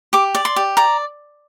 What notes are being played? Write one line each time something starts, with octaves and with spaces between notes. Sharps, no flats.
G4 D6
D5
C6
G4
D5 A#5